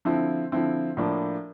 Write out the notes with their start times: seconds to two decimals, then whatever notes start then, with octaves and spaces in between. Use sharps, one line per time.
0.05 D3 F3 C4 E4
0.52 D3 F3 C4 E4
0.97 A2 F3 A#3 D4